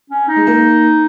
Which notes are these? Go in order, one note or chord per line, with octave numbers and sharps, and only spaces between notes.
C#4
D#4
G#3
A#3